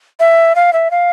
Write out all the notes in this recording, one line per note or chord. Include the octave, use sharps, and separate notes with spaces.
E5
F5
E5
F5